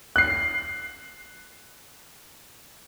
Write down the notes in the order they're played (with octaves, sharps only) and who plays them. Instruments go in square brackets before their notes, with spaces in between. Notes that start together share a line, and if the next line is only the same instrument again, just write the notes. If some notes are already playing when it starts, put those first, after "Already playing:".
[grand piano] F#6 C7